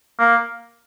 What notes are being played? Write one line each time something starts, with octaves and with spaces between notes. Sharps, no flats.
A#3